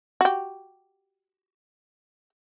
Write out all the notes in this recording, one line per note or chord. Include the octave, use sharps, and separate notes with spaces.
F#4 G4